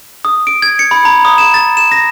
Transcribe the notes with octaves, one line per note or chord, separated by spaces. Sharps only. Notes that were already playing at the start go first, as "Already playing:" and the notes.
D#6
D7
G#6
C#7
B5
A#5
D#6
E7
A6
E7
A#6